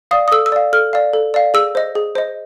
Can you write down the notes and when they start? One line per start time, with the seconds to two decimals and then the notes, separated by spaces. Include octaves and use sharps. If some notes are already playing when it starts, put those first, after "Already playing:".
0.11 D5 F5 D#6
0.28 D#6
0.32 A4 E6
0.46 E6
0.52 D5 F5
0.73 A4 F6
0.93 D5 F5
1.14 A4
1.34 D5 F5
1.54 G#4 E6
1.75 C5 D#5
1.95 G#4
2.15 C5 D#5